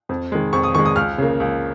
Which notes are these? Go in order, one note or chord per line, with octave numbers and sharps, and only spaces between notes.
F2
D#3 G#3
F2 C#6
D#6
D#3 G#3 C#6
D#6
C#2 F6
C#3 A#3
C#2